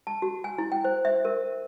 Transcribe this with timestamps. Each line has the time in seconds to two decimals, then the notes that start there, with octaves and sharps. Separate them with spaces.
0.07 A5
0.22 F#4
0.44 G#5
0.58 E4
0.72 G5
0.85 C5
1.05 E5
1.25 A#4